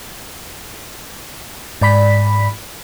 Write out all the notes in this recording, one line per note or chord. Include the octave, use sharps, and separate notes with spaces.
G#2 D5 B5 B6